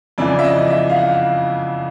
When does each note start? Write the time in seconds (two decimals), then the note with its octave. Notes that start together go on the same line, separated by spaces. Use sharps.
0.18 F2 C#3 E3 D5
0.39 E5
0.44 D#5
0.70 E5
0.90 F5
0.96 F#5